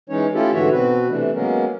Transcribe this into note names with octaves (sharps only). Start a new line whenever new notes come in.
E3 G#3 C#4 D#4 C#5
A3 C#4 E4 F4 G4 A4
G#2 D3 E3 F#4 C#5 E5
B2 C4 F#4 B4
C3 E3 A3 D4
F#3 G#3 A#3 B3 C#4 A#4